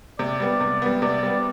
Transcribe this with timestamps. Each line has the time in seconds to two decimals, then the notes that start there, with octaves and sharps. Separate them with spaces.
0.19 C3 D5
0.40 G3 B3
0.60 C3
0.82 G3 B3
1.02 C3 D5
1.23 G3 B3